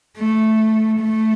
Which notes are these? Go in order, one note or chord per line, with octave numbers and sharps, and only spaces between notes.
A3
A3